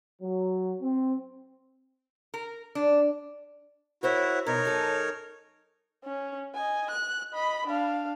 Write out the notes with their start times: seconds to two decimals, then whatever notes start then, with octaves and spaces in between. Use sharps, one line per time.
0.22 F#3
0.81 C4
2.34 A#4
2.75 D4
4.03 E4 F#4 A#4 C5 C#5
4.46 B2 D#4 A#4 C#5
4.65 F#2 A4 G#5
6.04 C#4
6.54 D#5 G#5
6.91 F#6
7.34 D#5 B5
7.68 D4 F5